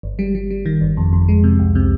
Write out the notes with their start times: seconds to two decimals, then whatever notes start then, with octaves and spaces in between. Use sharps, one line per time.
0.03 G1
0.19 G3
0.35 G3
0.50 G3
0.66 D#3
0.81 G1
0.97 F2
1.13 F2
1.28 G#3
1.44 C3
1.59 C2
1.75 C3